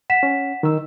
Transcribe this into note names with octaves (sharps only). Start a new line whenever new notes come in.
F#5 B6 E7
C#4
D#3 E6